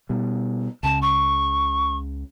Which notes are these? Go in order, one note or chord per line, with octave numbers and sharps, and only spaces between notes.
B2 G3
C#2 C#3 A5
C#6